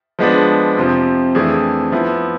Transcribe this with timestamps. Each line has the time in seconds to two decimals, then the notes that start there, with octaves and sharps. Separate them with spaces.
0.19 F3 G#3 B3 D4
0.77 F2 C3 F3
1.35 F2 E3 A3 D4 G#4
1.92 F3 B3 E4